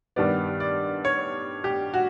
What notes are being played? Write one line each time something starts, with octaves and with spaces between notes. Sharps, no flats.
G2 D#3 G3 B3 D5
D5
C#5
G4
F#4